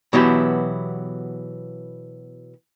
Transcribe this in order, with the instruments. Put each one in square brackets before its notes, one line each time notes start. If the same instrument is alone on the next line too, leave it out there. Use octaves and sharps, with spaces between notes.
[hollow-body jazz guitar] B2 E3 F#3 B3 E4 G4